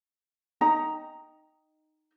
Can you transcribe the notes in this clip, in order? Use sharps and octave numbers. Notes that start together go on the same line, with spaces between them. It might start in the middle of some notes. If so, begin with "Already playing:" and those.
D#4 D#5 G5 A#5